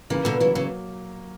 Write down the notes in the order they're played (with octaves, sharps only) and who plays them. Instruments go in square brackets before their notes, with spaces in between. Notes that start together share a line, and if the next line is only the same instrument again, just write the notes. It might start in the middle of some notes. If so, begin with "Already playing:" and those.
[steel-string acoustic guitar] C#3 E3 [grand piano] A#3
[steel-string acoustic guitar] B2 D3
[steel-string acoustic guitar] C#3 E3 [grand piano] F#3
[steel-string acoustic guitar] C#3 E3